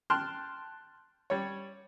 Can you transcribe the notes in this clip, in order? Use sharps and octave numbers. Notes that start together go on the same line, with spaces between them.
G5 A5 C6 F6 F#6
G3 C#5